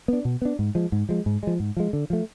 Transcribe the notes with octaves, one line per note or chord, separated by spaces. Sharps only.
B3 D4
B2
B3 D4
G#2
F3 G#3
G#2
F3 G#3
G#2
F3 G#3
G#2
F3 G#3
D3
F3 A3